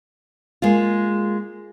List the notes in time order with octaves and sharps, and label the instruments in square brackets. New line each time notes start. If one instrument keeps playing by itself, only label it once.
[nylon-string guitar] G#3 A#3 F4